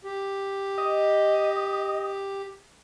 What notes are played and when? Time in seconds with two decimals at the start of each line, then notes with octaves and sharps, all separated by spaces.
0.04 G4
0.78 D#5